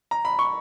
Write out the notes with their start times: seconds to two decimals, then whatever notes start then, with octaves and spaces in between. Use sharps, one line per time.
0.11 A#5
0.25 B5
0.39 C#6